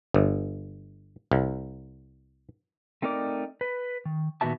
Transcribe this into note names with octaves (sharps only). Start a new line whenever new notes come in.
G1
C2
A3 C4 D#4 A#4 D5
B4
D#3
A#2 D#3 B3 F#4 E5 A5